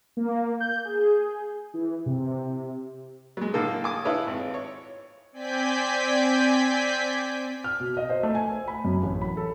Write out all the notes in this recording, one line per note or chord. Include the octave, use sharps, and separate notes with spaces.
A#3
G6
G#4
E3
C3
F#3 G#3
A2 D3 A#3 A4
G#5 D6 D#6
E4 F4 A4 B4 C#5
G#1
C#5
C4 D5 G#5 G6 B6
F6
B2
D#5
C5
A3
G#5
C5
B5
F#2
A1
B5
A4